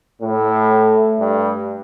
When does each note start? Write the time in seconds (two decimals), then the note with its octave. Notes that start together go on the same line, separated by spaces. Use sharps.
0.21 A2 A3
1.19 G2